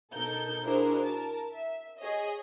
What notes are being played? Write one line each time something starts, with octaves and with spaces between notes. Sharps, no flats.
B2 D#4 A4 A#4 G6
D4 E4 F#4 G#4 A#4 C5
A#4 A5
E5
G#4 C#5 D#5